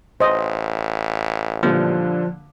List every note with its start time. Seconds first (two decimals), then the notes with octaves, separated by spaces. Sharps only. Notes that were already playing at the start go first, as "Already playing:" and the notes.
0.20 A1 C5 D#5
1.63 A#2 D3 F3 G3